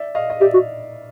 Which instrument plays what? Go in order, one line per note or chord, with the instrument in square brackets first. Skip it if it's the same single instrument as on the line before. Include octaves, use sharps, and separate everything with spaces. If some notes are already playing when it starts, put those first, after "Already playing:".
Already playing: [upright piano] D5 E5
D#5 F5
D#5
[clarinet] G4 [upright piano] D5 E5
[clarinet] F#4